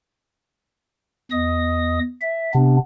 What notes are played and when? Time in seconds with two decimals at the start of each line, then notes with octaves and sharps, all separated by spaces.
1.31 E2 D#5 D#6
2.21 E5
2.54 C3 B3 D4